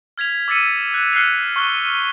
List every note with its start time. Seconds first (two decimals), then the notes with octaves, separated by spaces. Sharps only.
0.18 F6 G#6 B6 F7
0.48 D6 E6 A6 B6 C#7 D#7
0.94 F#6
1.13 F6 F#6 C7 C#7 F7
1.56 C#6 F6 F#6 G7